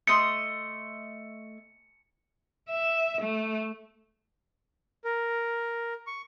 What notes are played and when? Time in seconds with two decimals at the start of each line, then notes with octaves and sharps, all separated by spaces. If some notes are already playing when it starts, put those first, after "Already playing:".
0.07 A3 D#5 C6 C#7
2.69 E5
3.22 A3
5.04 A#4
6.07 C#6